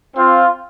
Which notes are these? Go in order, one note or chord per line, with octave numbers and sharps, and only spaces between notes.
C4 F4